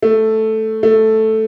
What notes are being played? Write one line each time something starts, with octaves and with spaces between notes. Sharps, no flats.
A3
A3